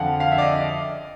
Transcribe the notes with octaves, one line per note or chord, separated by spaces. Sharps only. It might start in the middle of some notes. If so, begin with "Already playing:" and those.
Already playing: F2 D3 F3 F5 F#5
F5
E5
D5
D#5
D5